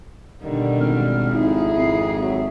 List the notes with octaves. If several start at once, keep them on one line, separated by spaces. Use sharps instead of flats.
B2 D3 D#3 G3
G#1 F6
F2 G#2 D#4 E4 G#4
G#1 C7
F#3 E5